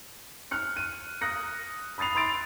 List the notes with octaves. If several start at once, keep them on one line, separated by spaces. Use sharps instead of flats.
F6 F#6 C#7
D#7
D#6 F#6 A#6 C#7
B5 D#6 A6 C7 F7
B5 C6 E6 A6 D7 F7